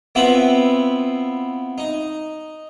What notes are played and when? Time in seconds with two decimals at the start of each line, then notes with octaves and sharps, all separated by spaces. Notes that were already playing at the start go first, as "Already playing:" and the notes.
0.15 B3 C4 E4 F4 E5 B5
1.78 D#4